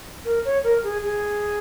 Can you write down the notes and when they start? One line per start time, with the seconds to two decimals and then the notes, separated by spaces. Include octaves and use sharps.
0.25 A#4
0.45 C#5
0.64 A#4
0.84 G#4
1.04 G#4